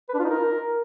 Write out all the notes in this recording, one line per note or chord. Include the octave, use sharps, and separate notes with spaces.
B4
D4
F4
D#4
A#4